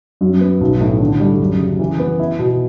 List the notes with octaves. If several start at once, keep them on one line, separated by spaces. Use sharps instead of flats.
F#2
B3
B1
A2
D3
G3
F#2
C#3
E3
B3
E4
B2